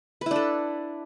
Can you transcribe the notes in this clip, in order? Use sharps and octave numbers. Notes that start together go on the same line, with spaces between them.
D4 E4 A4 B4